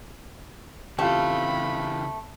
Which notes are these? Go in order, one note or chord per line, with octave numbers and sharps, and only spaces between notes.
C#3 E3 A3 C4 F4 G4 B5